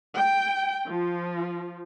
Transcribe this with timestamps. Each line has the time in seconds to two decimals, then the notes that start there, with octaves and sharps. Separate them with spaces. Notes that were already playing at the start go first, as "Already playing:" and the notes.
0.14 G5
0.88 F3